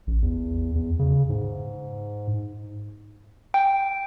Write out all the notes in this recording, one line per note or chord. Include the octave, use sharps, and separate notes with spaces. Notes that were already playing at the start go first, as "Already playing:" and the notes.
A1
E2
E2
C#3
G#2
G5